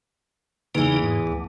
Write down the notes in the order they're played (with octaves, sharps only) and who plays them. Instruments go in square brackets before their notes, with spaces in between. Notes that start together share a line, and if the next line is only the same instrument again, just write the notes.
[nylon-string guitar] E2 E3 [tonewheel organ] C#3 A#3 D#4
[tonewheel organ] G#2
D2